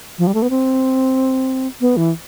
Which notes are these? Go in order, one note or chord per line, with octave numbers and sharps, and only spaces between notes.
F3
G3
A3
B3
C4
B3
E3